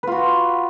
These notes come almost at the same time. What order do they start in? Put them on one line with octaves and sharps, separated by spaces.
B4 F4 F#4